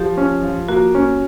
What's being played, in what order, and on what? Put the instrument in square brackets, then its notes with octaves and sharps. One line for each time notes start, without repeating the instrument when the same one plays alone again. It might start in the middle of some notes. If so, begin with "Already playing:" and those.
Already playing: [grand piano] F3 [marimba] G4
[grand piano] C#4
F3
[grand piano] A#3 [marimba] F#4
[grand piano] C#4